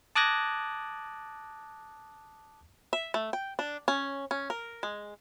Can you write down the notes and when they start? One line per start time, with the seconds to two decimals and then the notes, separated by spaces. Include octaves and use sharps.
0.16 A5 D6 D#6 F#6 G#6 A#6
2.93 E5
3.14 A3
3.33 G5
3.59 D4
3.88 C#4
4.31 C#4
4.50 A#4
4.83 G#3